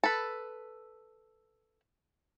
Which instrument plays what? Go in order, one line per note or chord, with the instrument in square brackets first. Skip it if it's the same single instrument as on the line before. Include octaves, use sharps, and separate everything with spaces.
[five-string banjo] A4 B4